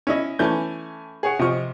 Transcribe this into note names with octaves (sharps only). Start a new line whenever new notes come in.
C#4 E4 D#5
E3 A3 C#4 G#5 A5 G6
G#4 C#5 F#5
C3 F3 D#5 C#6